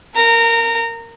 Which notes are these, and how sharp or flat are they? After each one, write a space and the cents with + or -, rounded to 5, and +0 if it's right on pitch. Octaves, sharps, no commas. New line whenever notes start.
A#4 -10 A#5 -25